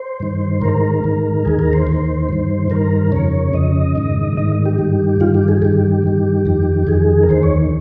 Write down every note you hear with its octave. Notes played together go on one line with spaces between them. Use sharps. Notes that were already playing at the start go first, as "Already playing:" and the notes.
Already playing: C5
G2 D#3
G#2 D#3 A#4
G#2 D#3
D#2 D#3 G#4
A#4
C5
D#2 D#3
G2 D#3
G2 D#3 A#4
F2 C#3 C#5
F2 C#3 D#5
G#2 D#3
G#2 D#3 D#5
G4
G2 D#3
G2 D#3 F4
G4
G#4
G2 D#3 G4
G2 D#3
F2 D#3
F2 D#3 G#4
A#4
D#2 D#3 C5
C#5